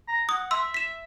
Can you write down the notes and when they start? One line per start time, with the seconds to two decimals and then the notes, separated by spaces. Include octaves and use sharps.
0.08 A#5
0.29 F#5 D#6
0.51 E5 C6 E6
0.74 B6 E7